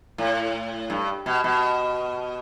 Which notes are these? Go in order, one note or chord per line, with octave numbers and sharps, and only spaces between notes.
A2
G2
B2
B2